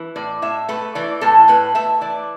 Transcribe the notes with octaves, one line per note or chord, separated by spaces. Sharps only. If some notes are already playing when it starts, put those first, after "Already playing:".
Already playing: E3
A2 D5
A2 E5
A3 B4
E3 D5
A2 A4
A2 B4
A3 E5
E3 D5